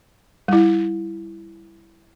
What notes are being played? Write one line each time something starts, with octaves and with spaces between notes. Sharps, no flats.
G3 E4